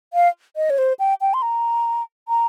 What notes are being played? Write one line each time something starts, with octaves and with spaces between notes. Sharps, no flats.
F5
D#5
C#5
C5
G5
G5
C6
A#5
A#5